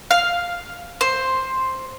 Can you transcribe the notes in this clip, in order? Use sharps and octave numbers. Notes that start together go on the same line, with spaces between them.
F5
C5